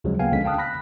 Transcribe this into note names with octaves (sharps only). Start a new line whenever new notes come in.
D2 C#3 F3 F#3 G#3
C#3 A#3 B3 F5 G5 G#5
C#2 D3 F3 G#3 C#4 B6
F5 G5 A5 D#6 F6 F#6
B5 F#6 A#6 B6